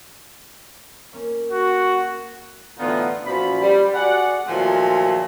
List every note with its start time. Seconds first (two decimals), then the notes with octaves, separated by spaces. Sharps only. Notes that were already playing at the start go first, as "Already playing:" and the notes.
1.13 A#3 C#4
1.52 F#4
2.78 A2 D3 E3 B3 D#4 F4
3.25 F#2 A#2 F3 B5
3.61 G3
3.93 G#3 F#4 D5 F#5
4.47 A#2 D#3 F3 F#3 G#3 A3